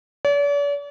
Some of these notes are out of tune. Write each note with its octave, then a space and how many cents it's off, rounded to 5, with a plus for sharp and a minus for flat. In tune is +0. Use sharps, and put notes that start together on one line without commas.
D5 -45